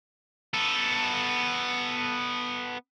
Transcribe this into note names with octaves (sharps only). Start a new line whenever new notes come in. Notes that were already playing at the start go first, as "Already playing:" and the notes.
B3 A4